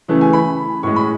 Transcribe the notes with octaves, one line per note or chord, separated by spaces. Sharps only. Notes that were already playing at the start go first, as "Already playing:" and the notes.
C#3 E3 A3
G#5
B5
A2 G#3 C#6
B5